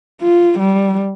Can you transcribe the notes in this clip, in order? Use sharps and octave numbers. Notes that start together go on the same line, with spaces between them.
F4
G3